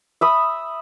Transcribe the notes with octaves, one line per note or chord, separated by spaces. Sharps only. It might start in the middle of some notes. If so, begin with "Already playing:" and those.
E5 B5 D#6